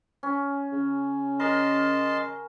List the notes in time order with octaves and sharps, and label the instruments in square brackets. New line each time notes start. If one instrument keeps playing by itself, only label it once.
[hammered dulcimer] C#4
[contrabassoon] C#3
[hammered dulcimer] A#4 [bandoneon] D#5 A5 C6